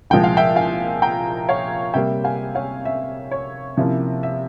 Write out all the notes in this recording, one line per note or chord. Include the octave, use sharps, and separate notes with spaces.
C2 A#2 F3 G#3 G5
F5
E5 G5
F5 G#5
G5 A#5
C#5 F5
C3 G3 A#3 E5 G5
F5 G#5
C#5 F5
E5
C#5
C3 F3 A#3 C#4 E4 E5
E5